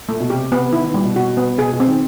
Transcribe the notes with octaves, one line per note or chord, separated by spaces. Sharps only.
A#2 A3
B2
C3 G4
C3 B3
D#3 E4
D#3
A#2 G3
B2
B2 F#4
B3
B2 G#4
B2
C4
D#3